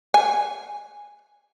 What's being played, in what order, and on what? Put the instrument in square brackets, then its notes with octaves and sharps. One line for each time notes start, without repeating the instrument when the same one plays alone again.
[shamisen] G#5